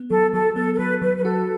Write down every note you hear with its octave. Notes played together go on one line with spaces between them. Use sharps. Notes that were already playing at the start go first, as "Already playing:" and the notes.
Already playing: B3
F#3 A4
F#3 A4
B3 A4
A4
F#3 B4
F#3 B4
B4
F#4 A4